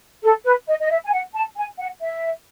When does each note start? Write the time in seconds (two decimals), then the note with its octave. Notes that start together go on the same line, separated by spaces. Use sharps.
0.24 A4
0.45 B4
0.68 D#5
0.80 D#5
0.90 E5
1.05 G#5
1.12 F#5
1.34 A5
1.56 G#5
1.78 F#5
2.01 E5